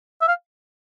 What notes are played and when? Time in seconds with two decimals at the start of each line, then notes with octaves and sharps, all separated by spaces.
0.21 E5
0.28 F5